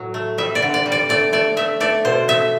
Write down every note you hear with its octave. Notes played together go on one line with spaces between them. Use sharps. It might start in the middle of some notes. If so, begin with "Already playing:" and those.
Already playing: A2 F#3
A3
G3 E5
D5
D3
D5
G3
D5
A3 D5
A3 D5
A3 E5
A3 D5
B2 C5
A3 E5